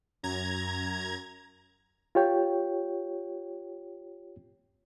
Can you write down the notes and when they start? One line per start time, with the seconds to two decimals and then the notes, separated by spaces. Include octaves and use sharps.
0.23 F#2 A#5 G#6
2.15 F4 G4 C#5 G5